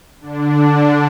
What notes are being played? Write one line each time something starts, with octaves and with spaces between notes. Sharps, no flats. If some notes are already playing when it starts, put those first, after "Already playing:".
D3 D4